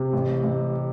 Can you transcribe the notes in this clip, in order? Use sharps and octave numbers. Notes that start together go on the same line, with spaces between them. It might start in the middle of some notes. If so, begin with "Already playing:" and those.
Already playing: C3
A1
A1